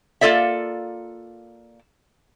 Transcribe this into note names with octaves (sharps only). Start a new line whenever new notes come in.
A#3 F4 A4 D5 E5